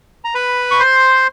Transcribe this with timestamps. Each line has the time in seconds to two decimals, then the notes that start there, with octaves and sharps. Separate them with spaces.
0.24 A#5
0.35 B4 B5
0.71 C#6
0.80 C5 C6